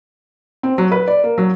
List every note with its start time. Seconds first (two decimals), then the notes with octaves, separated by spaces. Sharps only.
0.63 C4
0.78 F#3
0.92 B4
1.08 D5
1.24 A#3
1.38 F#3